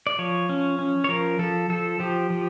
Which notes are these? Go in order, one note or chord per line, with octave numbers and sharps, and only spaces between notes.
D5
F3 C#5
C#4
C#4
C#5
F3 A#4
F3 A4
F3 A4
F3 G4
F3